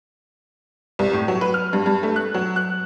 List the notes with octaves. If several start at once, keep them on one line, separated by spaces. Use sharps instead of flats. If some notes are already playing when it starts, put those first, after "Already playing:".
C2
A2
F#3
B4
F6
G2
G2
A3
F#6
F#3
F#6